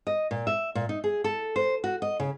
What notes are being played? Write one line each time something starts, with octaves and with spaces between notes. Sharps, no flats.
D#5
A#2
E5
A#2
D#4
G#4
A4
C5
F#4
D#5
C#3